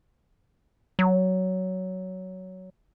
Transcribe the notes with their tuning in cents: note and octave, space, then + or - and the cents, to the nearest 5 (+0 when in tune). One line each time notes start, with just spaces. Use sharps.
F#3 +10